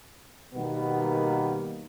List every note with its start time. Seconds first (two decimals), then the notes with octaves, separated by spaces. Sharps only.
0.54 B2 D#3 G3 A#3 B3